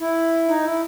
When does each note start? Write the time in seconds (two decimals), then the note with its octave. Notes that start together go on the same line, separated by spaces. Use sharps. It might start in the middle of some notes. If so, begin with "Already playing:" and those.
0.01 E4
0.48 D#4
0.65 E4